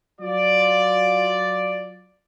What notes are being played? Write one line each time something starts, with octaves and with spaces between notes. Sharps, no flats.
F#3 F4 D5